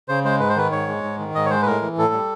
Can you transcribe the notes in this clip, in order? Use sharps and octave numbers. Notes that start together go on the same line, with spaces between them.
C#3 C5
G#3 C5
G#2 B4
C5
D#3 B4
G#2 C#5
G#3
G#2
D#3
G#2 D#5
C#5
G#3 C5
B4
A2 A#4
E3
A2 A4
G3